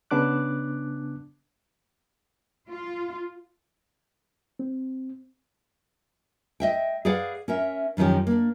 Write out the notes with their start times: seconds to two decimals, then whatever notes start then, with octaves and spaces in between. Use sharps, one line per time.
0.11 C#3 B3 D4 D6 F#6
2.69 F4
4.59 C4
6.60 D#5 E5 G5
7.05 G#4 B4 D5 F5 F#5
7.48 C#4 A#4 E5
7.97 F#2 D#3 F3 C#4 G4
8.27 A#3 D4